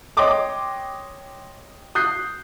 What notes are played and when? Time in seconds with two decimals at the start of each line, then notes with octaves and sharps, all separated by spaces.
0.17 C#5 D#5 G5 C6 D6 D#6
1.95 D#6 F#6 G6 C7